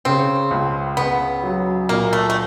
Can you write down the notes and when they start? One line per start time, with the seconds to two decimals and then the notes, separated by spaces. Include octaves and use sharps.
0.05 C#3 C4
0.51 C#2
0.97 C#2 B3
1.43 F#3
1.89 A#2 A#3
2.13 A3
2.30 A3